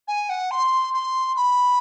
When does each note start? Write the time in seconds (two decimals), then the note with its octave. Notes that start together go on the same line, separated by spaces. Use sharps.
0.08 G#5
0.29 F#5
0.51 C6
0.94 C6
1.36 B5